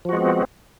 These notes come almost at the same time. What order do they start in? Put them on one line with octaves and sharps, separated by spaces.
F3 F#4 G#3 B3 C4